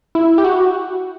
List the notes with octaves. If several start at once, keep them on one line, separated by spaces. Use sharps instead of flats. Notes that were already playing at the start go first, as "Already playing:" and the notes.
E4
G4
F#4